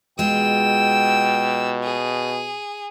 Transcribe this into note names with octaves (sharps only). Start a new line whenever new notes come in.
B2 G#3 F4 G5 E6
G#4